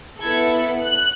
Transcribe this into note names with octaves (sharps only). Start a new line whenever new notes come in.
B3 E4 A4 G#6
F#6